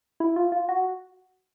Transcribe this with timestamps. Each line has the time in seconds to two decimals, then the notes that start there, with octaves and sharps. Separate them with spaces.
0.20 E4
0.36 F4
0.52 F4
0.69 F#4